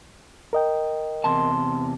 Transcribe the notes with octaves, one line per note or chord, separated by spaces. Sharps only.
A#4 D#5 G5
E2 C3 A5 C6